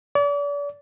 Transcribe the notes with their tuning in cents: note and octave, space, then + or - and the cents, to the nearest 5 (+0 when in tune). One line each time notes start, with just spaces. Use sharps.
D5 -40